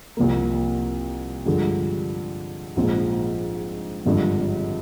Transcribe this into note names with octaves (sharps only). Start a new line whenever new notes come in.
C2 C3 F3 A#3
G2 D3 F3 G#3
A#1 G#2 F3 C4
G#1 G2 D3 F3